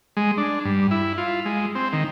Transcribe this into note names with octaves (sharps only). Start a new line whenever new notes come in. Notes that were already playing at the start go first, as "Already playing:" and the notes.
G#3
D4
G2
E4
F4
G#3
C4
D#3